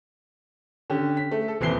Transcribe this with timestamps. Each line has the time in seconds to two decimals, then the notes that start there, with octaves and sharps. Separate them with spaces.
0.90 D3 C#4 G4
1.17 B6
1.31 A3
1.48 A4
1.61 D#1 E3 C4 C7 G7